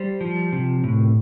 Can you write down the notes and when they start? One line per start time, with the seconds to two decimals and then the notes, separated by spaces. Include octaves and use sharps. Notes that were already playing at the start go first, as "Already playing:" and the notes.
Already playing: G3 C5
0.21 F3
0.53 C3
0.84 A2